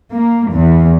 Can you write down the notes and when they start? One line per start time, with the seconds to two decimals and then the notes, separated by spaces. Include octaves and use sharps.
0.12 A#3
0.52 E2